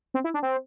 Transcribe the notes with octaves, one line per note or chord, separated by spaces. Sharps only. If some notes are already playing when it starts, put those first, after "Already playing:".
C4
E4
D4
C4